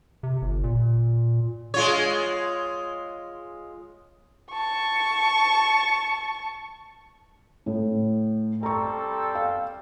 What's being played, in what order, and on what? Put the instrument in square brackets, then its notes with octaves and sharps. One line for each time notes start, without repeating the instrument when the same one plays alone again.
[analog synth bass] C3
G1
A#2
[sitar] G#3 F4 C#5
[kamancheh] A5 C#6
[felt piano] A2
[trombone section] G3 C4 A4 [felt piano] A#5 C#6
[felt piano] F5